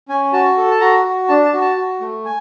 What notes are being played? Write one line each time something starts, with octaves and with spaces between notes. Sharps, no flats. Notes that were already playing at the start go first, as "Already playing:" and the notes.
C#4 G#5
F#4 A5
A4
A5
F#4 A#5
F#4
D4 A5
A5
F#4
A5
F#4
A3
G#5